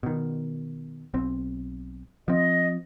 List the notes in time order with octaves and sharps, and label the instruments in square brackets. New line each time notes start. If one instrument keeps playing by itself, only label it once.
[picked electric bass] B2 D#3
B1 C4
[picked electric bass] F3 C4 [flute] D#5